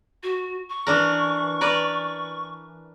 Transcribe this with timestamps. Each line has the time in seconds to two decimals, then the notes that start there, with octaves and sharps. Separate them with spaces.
0.23 F#4
0.70 C#6
0.87 E3 D4 A#4
1.61 A#4 B4 D5